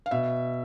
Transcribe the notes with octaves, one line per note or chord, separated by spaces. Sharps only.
F5
B2 E5